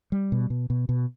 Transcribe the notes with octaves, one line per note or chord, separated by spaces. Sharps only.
G3
B2
B2
B2
B2